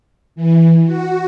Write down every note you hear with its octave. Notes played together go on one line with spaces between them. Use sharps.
E3
F#4